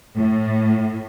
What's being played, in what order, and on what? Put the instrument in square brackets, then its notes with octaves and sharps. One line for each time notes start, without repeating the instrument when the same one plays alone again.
[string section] A2